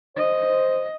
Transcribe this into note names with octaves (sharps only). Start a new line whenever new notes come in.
C5 D#5